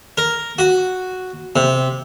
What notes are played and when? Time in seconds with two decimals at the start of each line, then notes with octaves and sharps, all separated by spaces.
0.18 A#4
0.59 F#4
1.56 C3